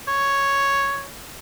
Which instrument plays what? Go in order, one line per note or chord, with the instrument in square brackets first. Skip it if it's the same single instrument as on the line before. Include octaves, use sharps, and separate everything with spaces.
[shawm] C#5